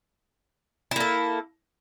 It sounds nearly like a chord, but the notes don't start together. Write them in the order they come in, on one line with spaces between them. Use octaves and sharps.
E4 A#3 A4